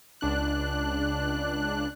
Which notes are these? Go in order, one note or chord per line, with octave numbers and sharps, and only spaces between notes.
C#2 D4 F#6